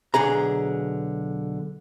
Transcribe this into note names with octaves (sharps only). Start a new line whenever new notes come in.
B1 D3 G#4 A#5